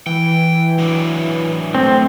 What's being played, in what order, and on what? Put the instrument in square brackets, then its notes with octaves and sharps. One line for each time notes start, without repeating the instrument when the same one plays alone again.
[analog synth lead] E3 [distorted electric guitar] G5
[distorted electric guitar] F#3 D4
[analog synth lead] A3 [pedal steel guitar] C4